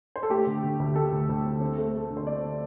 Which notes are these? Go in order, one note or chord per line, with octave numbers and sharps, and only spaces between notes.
C5
A4
A3 G4
D3
D3
D2
A3 A4
D2
D2
C4
C4
A3
A3
D3
C5
C4 D5
C4